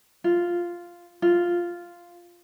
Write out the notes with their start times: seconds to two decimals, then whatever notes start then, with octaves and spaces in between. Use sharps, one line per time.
0.24 F4
1.22 F4